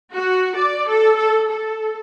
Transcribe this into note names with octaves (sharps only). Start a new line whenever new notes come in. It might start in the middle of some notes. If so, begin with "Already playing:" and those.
F#4
D5
A4
A4
A4